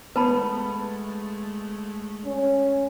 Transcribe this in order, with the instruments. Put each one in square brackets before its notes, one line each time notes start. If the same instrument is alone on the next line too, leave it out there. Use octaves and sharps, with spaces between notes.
[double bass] G#3 A3 [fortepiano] B3 [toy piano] B4 A5 B5
[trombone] C#4